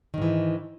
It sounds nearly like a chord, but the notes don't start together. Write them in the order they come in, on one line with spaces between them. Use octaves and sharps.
D#3 G#2 E3